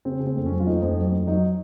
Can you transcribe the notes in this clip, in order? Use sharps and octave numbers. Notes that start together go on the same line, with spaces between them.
C#3 C4
C#3
C4
F2
C#4
F#3
F4
F2 D#4
F2
F#3
F2
F#3 D#4